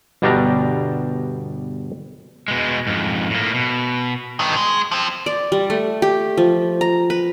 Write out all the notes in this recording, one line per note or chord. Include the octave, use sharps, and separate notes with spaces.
G1 B2 G3 D4 G5 A#5
B2 G#3
F2 G#2
A2 A#3
B2
G2 D#3
G#3
F3 C4
D5
G3
A3
G4
F3
A#5
B4